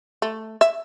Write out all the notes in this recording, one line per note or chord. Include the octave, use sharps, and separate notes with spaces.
A3
E5